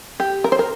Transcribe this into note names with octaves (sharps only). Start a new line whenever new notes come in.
G4
A#4
C5
A#4